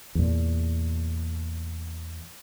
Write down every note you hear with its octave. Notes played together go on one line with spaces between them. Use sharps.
E2 A#2